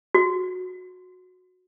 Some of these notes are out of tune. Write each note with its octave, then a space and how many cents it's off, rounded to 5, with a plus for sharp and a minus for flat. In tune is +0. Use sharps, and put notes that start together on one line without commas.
F#4 -15